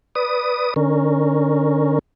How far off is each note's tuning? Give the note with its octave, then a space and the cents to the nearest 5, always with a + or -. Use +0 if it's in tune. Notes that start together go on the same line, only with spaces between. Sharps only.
B4 +0 D5 +0 D#6 +0
D3 +25 C#4 +0 A#4 +0